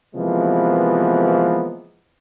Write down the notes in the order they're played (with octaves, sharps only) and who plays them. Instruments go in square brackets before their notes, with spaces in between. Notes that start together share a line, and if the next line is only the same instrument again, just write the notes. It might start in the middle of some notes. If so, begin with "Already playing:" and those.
[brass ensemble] C3 E3 F3 G#3 A#3 B3